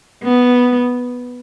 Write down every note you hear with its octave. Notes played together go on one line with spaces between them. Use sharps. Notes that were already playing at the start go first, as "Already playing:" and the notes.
B3